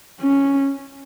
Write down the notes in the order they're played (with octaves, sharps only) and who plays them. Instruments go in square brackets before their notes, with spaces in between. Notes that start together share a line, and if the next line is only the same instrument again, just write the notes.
[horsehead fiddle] C#4